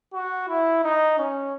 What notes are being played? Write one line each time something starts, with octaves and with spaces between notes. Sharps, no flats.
F#4
E4
D#4
C#4